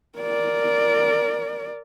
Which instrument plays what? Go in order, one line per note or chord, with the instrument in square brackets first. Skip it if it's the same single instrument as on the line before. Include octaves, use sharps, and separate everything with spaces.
[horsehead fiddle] A#4 D5